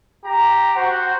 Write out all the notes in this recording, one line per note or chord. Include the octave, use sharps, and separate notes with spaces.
G4 A#5
F#4 C5 F#5